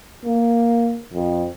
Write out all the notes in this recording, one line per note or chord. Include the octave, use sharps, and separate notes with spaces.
A#3
F2